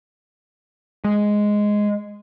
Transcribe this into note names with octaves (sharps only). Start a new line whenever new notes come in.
G#3